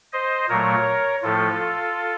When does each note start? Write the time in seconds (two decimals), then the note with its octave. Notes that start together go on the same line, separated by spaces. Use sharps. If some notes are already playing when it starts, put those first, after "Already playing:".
0.12 C5 D#5
0.49 A#2 F#3 A3 A#4 C#5
1.23 A2 F3 A3 F4 A4